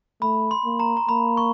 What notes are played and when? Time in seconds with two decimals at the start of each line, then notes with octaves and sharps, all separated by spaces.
0.21 A3 B5
0.51 C6
0.65 A#3
0.80 A#5
0.97 A#5
1.09 A#3 B5
1.37 C#6